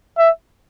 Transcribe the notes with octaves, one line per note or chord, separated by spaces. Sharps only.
E5